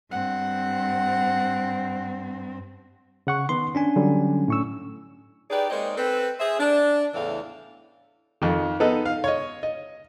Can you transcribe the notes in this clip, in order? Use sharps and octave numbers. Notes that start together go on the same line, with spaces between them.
G2 C4 F#5
C#3 F#5 C#6
D#3 B3 C6
C#4 D4 G#5
D3 F#3 G3
A2 C#6 E6
D#4 G4 G#4 B4 D5
G#3 A#3 C4 D#4 C#5 D5
C4 A4 B4
G#4 C5 E5
D4
E2 A2 C#3 E3 D5 F5
F2 D#3
B3 D#4 A4 D#5
F5
C#5 D#5
D#5